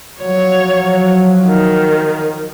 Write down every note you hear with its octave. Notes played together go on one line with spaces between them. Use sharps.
F3 F#3 C#5
D#3